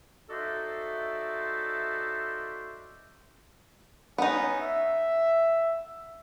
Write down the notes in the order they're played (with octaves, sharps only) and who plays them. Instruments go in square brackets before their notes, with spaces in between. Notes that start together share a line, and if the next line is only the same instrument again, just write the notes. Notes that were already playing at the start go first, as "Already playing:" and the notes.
[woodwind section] D#4 F#4 A4 C5 D5 E5
[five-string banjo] B3 D#4 [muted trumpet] C#4
[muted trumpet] E5